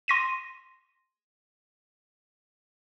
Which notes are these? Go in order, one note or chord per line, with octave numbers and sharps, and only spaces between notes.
C6 A#6 D#7